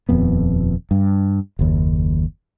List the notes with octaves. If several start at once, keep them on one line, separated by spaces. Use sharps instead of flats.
D#1 F2 B3
G2
F#1 D#2